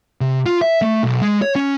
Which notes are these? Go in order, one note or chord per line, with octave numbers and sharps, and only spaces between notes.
C3
F4
E5
A3
B1
G#3
C#5
C#4